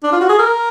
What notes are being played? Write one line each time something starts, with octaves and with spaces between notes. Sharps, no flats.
D4
F4
F#4
G#4
A#4